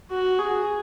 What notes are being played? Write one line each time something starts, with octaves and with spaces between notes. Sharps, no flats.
F#4
G#4